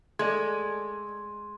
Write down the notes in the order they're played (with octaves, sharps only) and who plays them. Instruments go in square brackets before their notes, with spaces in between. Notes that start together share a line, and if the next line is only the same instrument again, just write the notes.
[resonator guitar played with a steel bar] G#3 [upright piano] A3 [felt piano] D5 D#5 G#6 [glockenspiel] C6